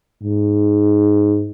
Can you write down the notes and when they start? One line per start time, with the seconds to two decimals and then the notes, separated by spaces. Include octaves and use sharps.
0.23 G#2